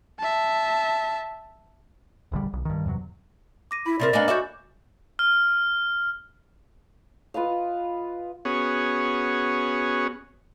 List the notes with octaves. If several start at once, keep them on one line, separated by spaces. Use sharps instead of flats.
E5 A5
D#1 A#1 D3 G3
B1
G2 D#3
E2 G2 C3 F#3
D6 A#6 D#7
E4 B5 B6
C3 C4 A#4 D5
A#3 B3 D4 D#5 G#5 F#7
F#4 D5 E5 D6 G6
F6
F4 B4 D#5 F5
B3 C#4 F#4 G#4 C#5